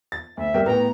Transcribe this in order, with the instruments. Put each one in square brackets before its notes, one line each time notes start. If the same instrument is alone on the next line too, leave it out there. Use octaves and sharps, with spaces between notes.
[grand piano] A6
[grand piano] D2 [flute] E5
[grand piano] C2 [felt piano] A#4 G5
[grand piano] A2 E3 G5 [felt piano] B3 [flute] A#5